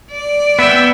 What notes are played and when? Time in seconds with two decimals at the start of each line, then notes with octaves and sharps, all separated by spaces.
0.11 D5
0.59 B3 E5 G5